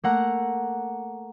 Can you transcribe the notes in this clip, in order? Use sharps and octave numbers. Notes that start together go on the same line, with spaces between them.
A3 A#3 F#5 A#5